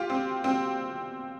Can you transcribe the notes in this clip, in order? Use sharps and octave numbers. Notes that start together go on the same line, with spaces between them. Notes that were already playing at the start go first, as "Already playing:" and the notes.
Already playing: F4 G4
C4
C4